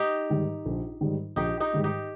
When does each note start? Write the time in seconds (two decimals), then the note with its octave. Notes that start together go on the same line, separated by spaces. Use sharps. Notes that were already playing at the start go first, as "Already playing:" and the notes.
Already playing: D#4 G4
0.30 G#2 D#3 G3
0.66 A#1
1.01 G#2 D#3 G3
1.36 A#1 D#4 G4
1.60 D#4 G4
1.73 G#2 D#3 G3
1.84 D#4 G4